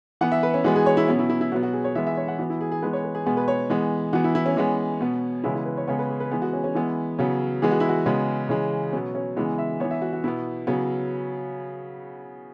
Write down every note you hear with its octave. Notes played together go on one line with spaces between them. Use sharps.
E3 B3 F#5
E5
B4
C#4
E3 G#3 B3 F#4
G#4
C#5
E4
B2 F#3 B3 C#4
E4
E4
E4
B2 F#3 B3 F#4
F#4
G#4
C#5
E3 G#3 B3 E5
E5
C#5
F#5
E3 B3 F#4
E4
G#4
G#4
E3 G#3 B3 B4
C#5
B4
G#4
B2 G#3 B3 G#4
B4
C#5
E3 G#3 B3
E3 B3 F#4
E4
E4
C#4
E3 G#3 B3
B2 B3
C#3 E3 G#3 B3 E4
E4
B4
C#5
C#3 G#3 B3 C#5
B4
G#4
B4
E3 G#3 B3 G#4
F#4
C#4
C#4
E3 G#3 B3 E4
C#3 F#3 B3
E3 G#3 B3 G#4
F#4
E4
F#4
C#3 G#3 B3
C#3 E3 G#3
B2 F#3 B3 C#4
C#4
C#3 E3 G#3 B3 E4
E5
E3 B3 C#5
E5
F#4
F#4
B2 B3 E4
C#3 F#3 B3